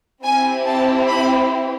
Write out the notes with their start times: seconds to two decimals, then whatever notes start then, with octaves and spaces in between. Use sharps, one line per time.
0.24 C4 E4 G4 G#5
0.66 A5
1.08 B5